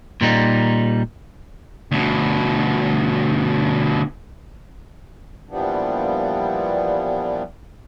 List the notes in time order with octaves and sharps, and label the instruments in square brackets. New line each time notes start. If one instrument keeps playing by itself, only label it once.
[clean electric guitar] A#2 G3 D#4
[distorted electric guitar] D2 B2
[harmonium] A#2 E3 F3 G3 B3 D4